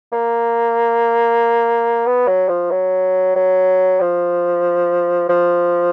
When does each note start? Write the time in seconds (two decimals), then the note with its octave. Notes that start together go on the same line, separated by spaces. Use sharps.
0.12 A#3
2.06 B3
2.28 F#3
2.49 F3
2.71 F#3
3.35 F#3
4.00 F3
5.29 F3